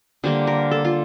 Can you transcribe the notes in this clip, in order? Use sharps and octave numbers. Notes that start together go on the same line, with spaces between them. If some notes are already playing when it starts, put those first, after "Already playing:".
D3 G3 A#3 C5
A#4
A4
F4